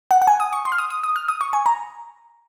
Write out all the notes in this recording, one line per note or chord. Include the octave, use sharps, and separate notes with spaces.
F#5
F#5
G#5
D#6
C#6
C6
F6
D#6
D#6
D#6
F6
D#6
C#6
G#5
A#5